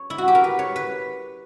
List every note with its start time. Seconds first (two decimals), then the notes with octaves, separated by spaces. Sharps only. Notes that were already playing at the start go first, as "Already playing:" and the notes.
Already playing: C#5
0.10 E4
0.18 F#4
0.28 G4
0.35 A#4
0.44 B4
0.59 C#5
0.76 B4